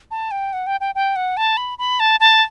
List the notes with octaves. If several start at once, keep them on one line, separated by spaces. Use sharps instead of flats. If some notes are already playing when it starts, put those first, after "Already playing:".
A5
G5
F#5
G5
G5
G5
F#5
A5
B5
B5
A5
A5